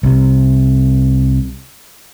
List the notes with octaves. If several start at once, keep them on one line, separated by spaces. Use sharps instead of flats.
C2 C3